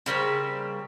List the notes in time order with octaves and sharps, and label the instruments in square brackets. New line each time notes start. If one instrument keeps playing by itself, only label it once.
[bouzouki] C#3 G3 A#3 C4